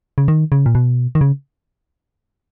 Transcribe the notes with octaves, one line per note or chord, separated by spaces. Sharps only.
C#3
D#3
C#3
A#2
B2
D#3
C#3